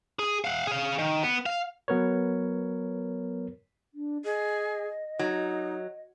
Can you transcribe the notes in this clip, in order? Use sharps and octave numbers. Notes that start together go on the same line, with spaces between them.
G#4
F5 F#5
G#4 F5
D#3
B3
F5
F#3 B3 A#4 B4 C#5
D4
G#4 D#5
F#3 D#4